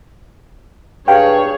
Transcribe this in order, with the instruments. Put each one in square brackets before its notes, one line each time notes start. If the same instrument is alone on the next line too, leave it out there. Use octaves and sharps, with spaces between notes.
[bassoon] G2 [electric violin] G#4 C#5 [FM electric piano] F5 G5